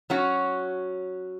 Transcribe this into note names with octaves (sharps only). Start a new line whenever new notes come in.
F#3 C#4 F#4